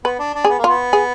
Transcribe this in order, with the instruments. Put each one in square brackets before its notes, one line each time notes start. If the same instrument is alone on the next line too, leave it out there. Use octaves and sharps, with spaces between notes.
[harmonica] B3 [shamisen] B4
[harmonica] D4
D4
[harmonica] B3 [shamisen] G#4
[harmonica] A#3
[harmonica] B3 [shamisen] F4
[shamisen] G#4